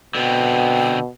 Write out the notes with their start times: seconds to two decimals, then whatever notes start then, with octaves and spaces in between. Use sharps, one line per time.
0.15 B2 D3 B3 C4 G5